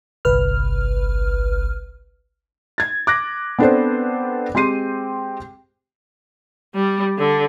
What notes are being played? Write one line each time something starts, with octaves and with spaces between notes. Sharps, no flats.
G1 C2 B4 F6
G#6 A6
D6 F#6 A#6
B3 C4 D4 A4 B4 C5
G#3 C4 G4 C6 C7 D#7
G3
D3